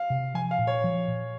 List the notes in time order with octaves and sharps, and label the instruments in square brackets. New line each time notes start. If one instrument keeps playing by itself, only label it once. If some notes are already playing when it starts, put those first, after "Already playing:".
Already playing: [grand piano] F5
[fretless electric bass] C3
[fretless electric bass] F3 [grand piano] G#5
[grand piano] F5
[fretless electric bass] A#2
[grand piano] C#5
[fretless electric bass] F3
A#2